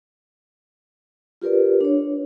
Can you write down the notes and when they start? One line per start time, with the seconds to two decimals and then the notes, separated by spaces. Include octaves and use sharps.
1.42 F4 G4 A#4 B4 D5
1.81 D4 C#5